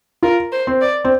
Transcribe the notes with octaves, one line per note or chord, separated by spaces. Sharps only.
F4 A#4
C5
C4
D5
C4